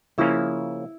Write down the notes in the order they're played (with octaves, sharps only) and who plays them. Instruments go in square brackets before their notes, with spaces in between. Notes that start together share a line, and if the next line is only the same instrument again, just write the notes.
[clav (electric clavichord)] C#3 F3 A#3 C#4 [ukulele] E4